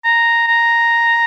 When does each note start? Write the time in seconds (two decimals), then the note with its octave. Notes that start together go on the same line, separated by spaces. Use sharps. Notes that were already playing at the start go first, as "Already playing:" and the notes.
0.04 A#5
0.48 A#5